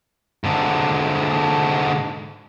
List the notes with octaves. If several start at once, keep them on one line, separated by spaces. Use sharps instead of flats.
G#2 D3